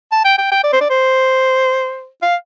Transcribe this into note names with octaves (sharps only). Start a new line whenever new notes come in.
A5
G5
G5
G5
D5
C5
D5
C5
F5